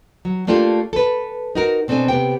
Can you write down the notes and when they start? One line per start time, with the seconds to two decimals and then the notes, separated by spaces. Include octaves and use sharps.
0.25 F#3
0.47 A3 A#3 D4 F4 G4 A4
0.93 A4 B4
1.55 D#4 F#4 A#4
1.88 B2 C4 D4 A4 G#5
2.08 C3 B3 G4 G5